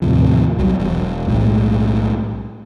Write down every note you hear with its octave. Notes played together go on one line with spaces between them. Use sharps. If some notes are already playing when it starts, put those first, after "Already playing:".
D#2 A2 C3 F3
B1 F#3 G3
E1
B1 A2 G#3